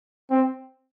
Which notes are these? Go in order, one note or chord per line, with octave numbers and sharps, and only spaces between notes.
C4